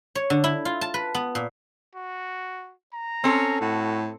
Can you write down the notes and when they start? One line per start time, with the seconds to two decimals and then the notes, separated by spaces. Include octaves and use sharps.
0.15 C#5
0.30 D3
0.44 E4
0.65 F4
0.81 A5
0.94 B4
1.15 B3
1.35 A#2
1.95 F#4
2.93 A#5
3.24 C4 C#4 A4
3.61 A2 F#4